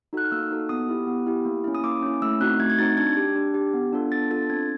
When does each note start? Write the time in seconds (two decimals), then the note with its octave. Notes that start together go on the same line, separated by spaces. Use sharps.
0.13 D#4 F#4 A4 F#6
0.25 F6
0.32 A#3 E6
0.51 D#4 F#4 A4
0.69 B3 D#6
0.89 E4 G4
1.07 B3
1.26 E4 G4
1.45 A#3
1.64 C#4 E4
1.75 D#6
1.84 A#3 D6
2.02 C#4 E4
2.22 A3 E6
2.41 C4 D#4 F#4 F#6
2.60 A3 G#6
2.70 G#6
2.78 C4 D#4 F#4 A6
2.97 D4 G#6
3.17 G4
3.36 D4
3.54 G4
3.74 B3
3.93 D4 F4 A4
4.11 B3 A6
4.31 D4 F4 A4 A6
4.50 C4 G#6